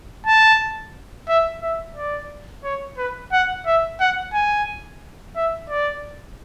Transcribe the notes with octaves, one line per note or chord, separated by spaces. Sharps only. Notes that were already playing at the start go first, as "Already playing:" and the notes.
A5
E5
E5
D5
C#5
B4
F#5
E5
F#5
G#5
E5
D5